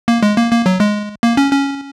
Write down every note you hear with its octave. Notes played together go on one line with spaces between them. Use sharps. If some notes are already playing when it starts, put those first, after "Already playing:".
A#3
G#3
A#3
A#3
F#3
G#3
A#3
C#4
C#4